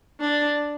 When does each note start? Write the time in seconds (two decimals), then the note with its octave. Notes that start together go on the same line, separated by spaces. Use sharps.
0.20 D4